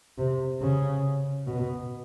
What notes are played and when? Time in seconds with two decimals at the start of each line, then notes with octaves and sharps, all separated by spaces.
0.18 C3
0.61 C#3
1.47 B2